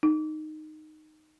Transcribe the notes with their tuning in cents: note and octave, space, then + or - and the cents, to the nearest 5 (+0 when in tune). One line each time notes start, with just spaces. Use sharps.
D#4 -10